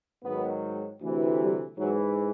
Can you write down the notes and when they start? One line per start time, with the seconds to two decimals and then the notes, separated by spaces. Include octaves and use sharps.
0.23 G#2 D#3 F#3 B3
1.00 D2 C3 E3
1.39 G3
1.77 G#2 E3 F#3